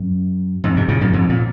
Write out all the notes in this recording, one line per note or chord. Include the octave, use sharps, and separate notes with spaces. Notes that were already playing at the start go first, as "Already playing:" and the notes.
Already playing: F#2
F2 G#2
G#2 C3
A#2 C#3
F#2 A#2
F2 G#2
A#2